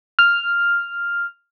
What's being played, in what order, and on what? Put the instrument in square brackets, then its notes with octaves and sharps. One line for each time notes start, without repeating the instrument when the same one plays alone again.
[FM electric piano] F6